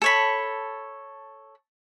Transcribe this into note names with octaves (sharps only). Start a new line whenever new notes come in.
A4 C#5 B5